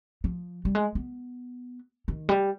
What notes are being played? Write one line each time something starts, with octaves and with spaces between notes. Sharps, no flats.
F3
G3
G#3
B3
D#3
G3